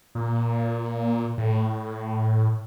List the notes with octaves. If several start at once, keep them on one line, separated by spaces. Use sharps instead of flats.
A#2
A2